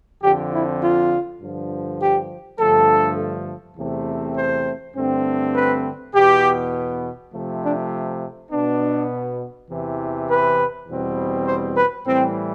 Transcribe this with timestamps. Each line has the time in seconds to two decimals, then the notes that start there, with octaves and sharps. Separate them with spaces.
0.22 F2 D3 F3 C4 G4
0.52 E4
0.81 F4
1.40 G2 D3 F3
1.99 G4
2.59 G2 D3 F3 A3 A4
3.78 E2 C3 E3 A3 C4
4.37 C5
4.96 G2 D3 A3 C4
5.55 B4
6.14 E2 B2 B3 G4
7.33 C3 F3 A3
7.63 D4
8.51 B2 B3 D4
9.69 E2 C3 E3
10.29 B4
10.88 E2 B2 G3 C4
11.46 C5
11.76 B4
12.06 A2 E3 G3 C4